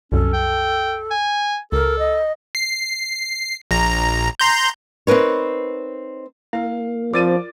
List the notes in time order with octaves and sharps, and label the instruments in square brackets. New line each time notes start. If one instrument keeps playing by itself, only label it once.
[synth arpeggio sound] C2 F#2 [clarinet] C#4 [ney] A4
[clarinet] G5
G#5
[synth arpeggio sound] C#2 [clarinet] A4 [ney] A#4
[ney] D#5
[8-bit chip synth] C7
A#1 A#5
A#5 C6 G6
[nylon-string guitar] C4 D#4 A#4 B4 C#5
[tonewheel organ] A#3 [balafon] E4 A#4 [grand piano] F5
[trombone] F3 [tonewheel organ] C4 [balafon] F4 A#4 D5 [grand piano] D6 A6 D#7